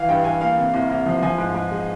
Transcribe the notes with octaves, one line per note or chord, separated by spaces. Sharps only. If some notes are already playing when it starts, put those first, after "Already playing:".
Already playing: E3 F5
G2 G5
G2 G#5
A#3 F5
C3
C2
C2
F3
F3 G#5
G#2
G#2
G#3